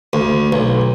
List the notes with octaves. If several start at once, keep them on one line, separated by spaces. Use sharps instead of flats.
D2
B1